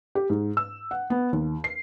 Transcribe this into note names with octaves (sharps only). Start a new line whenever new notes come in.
G4
G#2
E6
F#5
B3
D#2
C7